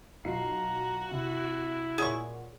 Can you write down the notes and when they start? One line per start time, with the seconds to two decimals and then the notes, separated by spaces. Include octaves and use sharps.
0.25 B1 F4 F#4 A#5 C7
1.11 C3 E4
1.98 A#2 G#4 C#5 F#5 C#6